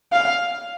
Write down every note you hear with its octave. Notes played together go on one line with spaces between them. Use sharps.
F5